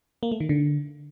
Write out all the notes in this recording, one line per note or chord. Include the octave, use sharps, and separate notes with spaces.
A#3
A3
D#3
D3